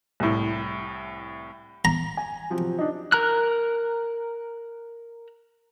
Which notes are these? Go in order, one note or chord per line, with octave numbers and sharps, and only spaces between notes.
C2 A2
A#5
G#5
C3 F3 F#3
D4 D#4
A#4 A#5 F6 F#6